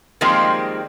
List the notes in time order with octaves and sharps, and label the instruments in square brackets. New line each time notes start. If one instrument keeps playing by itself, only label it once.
[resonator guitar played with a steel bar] D#3 F3 G3 G#3 A#3 C4